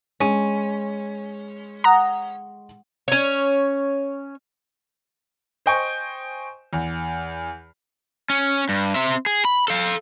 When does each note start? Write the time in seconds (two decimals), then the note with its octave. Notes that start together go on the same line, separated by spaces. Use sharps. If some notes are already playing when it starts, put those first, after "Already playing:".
0.20 G#3 C#4 D#7
1.84 F#5 A#5 D#6 F#6
3.08 C#4 C#5
5.66 C5 D#5 G5 G#5 C#6
6.73 E2
8.30 C#4
8.69 G2
8.95 C4 E5
9.26 G#4
9.45 B5
9.68 A4 F5